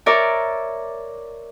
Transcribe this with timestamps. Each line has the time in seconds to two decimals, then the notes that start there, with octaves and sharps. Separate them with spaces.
0.06 A#4 C#5 D5 E5